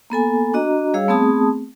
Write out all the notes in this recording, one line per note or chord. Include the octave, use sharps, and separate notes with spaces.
A#3 B3 A4 G#5
D4 F#4 D#5 A#5
G3 G#4 C#5 F5 E6
A3 B3 C4 G#4 A5 D#6